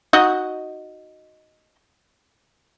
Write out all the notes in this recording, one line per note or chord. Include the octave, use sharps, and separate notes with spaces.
D#4 F#4 D#5